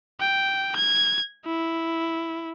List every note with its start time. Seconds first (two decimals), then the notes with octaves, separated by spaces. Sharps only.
0.20 G5
0.76 G#6
1.46 E4